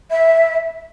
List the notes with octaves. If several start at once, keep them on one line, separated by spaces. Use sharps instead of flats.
E5